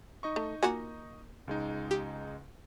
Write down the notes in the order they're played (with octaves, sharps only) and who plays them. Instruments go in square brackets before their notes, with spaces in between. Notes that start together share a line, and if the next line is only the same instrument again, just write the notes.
[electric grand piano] D#4 D#5 C#6
[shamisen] A3
[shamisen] A#3 F4 G#5 [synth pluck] F#4 F#5
[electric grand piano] C#2 G#3 D#4
[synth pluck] G4